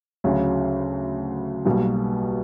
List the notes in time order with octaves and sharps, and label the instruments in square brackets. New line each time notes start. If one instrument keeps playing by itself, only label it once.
[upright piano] D2 C#3 F#3
B1 B2 G3 A#3